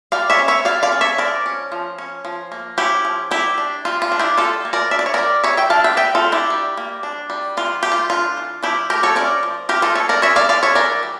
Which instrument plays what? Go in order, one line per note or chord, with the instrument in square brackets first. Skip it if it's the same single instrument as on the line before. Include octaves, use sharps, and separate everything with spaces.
[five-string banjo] G3 D5 F5
C#5 E5
C#4
C#5 E5
G3 D5 F5
D5 F5
C#4
C#5 E5
F3 A#4 D5
C#4
F3
C#4
F3
A#3
C#4 E4 G4
F3
G3 E4 G4
D4
G3 F4
F4
D4
E4 G4
G3 F4 A4
A#3
A#4 D5
D4 E5
D5
C#5
G3 A#4 D5
G3 C#5 E5
E5 G5
D4 F5 A5
E5 G5
G3 E5 G5
F4 A4
D4
E4 G4
G3
A#3
D4
G3
E3 F4
A3 G4
F4
D4 F4
E3
F3 E4 G4
A3 G4 A#4
A4 C#5
C#4 A#4 D5
F3
E3 G4 A#4
F4 A4
G3 A4 C#5
A#4 D5
C#4 C#5 E5
D5 F5
E3 D5 F5
C#5 E5
E3 A#4 D5
G3